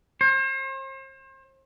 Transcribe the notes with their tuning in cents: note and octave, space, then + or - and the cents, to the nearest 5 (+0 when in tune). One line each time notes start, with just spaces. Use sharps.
C5 +40